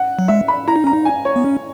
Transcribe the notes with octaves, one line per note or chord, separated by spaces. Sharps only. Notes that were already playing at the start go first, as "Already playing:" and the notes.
Already playing: F#5
F#3
G#3 E5
B5
E4 A#5
D#4
C#4 A#5
D#4
G#5
C#5
B3
C#4